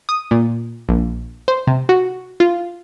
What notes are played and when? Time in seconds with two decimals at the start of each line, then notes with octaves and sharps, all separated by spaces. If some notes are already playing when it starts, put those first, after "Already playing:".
0.09 D#6
0.31 A#2
0.89 A#1
1.48 C5
1.67 C3
1.89 F#4
2.40 F4